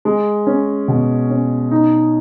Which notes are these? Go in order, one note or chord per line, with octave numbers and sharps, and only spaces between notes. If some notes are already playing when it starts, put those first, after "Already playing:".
G#3
C#4
B2
C#4
D#4